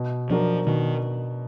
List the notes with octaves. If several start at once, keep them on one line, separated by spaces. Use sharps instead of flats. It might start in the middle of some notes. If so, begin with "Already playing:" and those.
Already playing: B2
F3 F#3 D4 F#4 A#4
B2 D#3